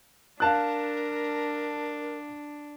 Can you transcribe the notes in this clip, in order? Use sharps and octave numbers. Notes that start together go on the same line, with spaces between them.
D4 A#4 F5 A5 F#6